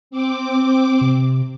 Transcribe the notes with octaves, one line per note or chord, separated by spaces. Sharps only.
C4 D6
C3